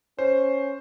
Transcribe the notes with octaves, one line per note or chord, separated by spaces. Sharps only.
C#4 C5